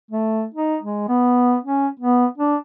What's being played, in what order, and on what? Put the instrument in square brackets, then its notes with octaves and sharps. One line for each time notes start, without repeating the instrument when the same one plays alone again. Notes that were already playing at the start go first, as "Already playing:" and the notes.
[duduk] A3
D#4
G#3
B3
C#4
B3
D4